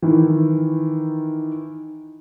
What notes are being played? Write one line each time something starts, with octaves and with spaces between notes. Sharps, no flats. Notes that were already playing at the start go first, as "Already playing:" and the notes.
D#3 E3